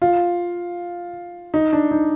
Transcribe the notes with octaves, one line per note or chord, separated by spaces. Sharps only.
F4
D#4
D4
D#4